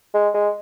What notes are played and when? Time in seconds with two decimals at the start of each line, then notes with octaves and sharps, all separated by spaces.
0.14 G#3
0.34 G#3